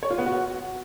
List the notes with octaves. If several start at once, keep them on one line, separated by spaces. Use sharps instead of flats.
C#5
F4
B3
F#4